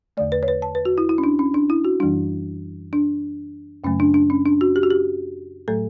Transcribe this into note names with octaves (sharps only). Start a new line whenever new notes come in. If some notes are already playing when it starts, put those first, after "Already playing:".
E2 D3 A3 D5
B4
C#5
B4
A5
B4
F#4
E4
E4
C#4
D4
C#4
D4
E4
F#4
F#2 E3 G3 D4
D4
F#2 C#3 F#3 A3 C#4
D4
D4
C#4
D4
F#4
G4
F#4
G4
A2 F#3 A3 A4